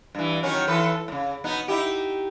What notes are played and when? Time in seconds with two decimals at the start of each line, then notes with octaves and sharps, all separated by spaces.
0.15 G2 E3
0.43 D#3 F#3 C#4
0.68 E3 A4 B4
1.08 A2 C#3
1.44 B2 B3 D#4
1.68 D#4 E4 G4